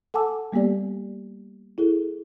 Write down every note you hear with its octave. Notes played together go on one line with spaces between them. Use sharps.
A4 F#5 G#5 A5 D6 E6
G3 A#3 B3 G4 D5
E4 G#4 A4